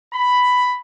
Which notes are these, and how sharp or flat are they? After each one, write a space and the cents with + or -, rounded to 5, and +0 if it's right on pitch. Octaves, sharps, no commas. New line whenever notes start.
B5 +5